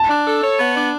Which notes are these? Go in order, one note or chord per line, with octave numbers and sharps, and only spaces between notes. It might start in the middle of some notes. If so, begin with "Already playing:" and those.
Already playing: A5
D4
A4
C#5
B3
D4